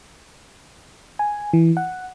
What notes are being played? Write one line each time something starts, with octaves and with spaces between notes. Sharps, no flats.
G#5
E3
F#5